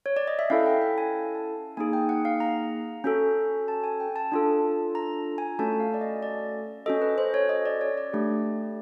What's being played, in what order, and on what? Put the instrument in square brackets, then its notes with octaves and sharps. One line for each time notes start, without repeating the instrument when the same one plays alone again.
[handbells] C#5
D5
D#5
E5
C#4 E4 A4 F5
G5
G5
G#5
A5
A#3 D#4 G#4 G#5
G5
F#5
F5
A#5
C#4 F#4 A4
A5
G#5
G5
A5
D4 F4 A4
A#5
G#5
A3 C#4 F#4 A4 A5
F5
D5
D#5
D5
C#4 F#4 A4 D#5
B4
C5
C#5
D#5
D5
C#5
D5
A3 D4 G4